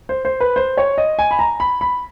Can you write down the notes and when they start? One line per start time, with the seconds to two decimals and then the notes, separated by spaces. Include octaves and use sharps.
0.09 C5
0.25 C5
0.41 B4
0.56 C5
0.77 C#5
0.98 D#5
1.19 G#5
1.31 B5
1.39 A#5
1.60 B5
1.81 B5